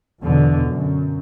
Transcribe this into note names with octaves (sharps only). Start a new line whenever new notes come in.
E2 B2 D3
F#2